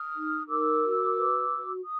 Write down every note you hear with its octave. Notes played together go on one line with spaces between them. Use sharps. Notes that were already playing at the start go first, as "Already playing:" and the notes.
Already playing: D#6 F6
D#4
A#4 D6 E6
F#4
B4
F#4
D#6